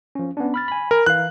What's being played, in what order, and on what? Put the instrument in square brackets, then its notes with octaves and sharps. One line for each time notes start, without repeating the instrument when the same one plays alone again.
[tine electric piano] F3 C#4
B3 C#4 D4
B5 F6 A6
G#5 B5
[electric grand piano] A#4
[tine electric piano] E3 F5 [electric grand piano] F#6